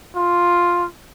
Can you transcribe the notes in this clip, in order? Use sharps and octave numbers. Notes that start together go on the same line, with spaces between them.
F4